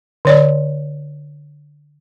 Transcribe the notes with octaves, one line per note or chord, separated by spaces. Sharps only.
D3 C#5 D5